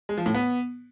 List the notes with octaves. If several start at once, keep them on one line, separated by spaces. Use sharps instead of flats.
G#3
F3
A2
B3